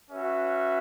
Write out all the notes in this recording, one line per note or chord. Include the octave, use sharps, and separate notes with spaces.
C#4 F#4 B4 E5